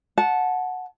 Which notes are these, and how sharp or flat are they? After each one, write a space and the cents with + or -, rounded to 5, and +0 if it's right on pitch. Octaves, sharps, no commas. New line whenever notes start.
F#5 -10 A5 -15